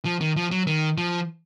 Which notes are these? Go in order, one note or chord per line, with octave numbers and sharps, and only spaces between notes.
F3
D#3
F3
F#3
D#3
F3